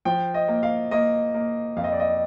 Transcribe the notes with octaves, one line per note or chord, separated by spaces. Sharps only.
F3 G5
D#5
A#3
F5
A#3 D#5
A#3
F2 F5
D#5
D5
D#5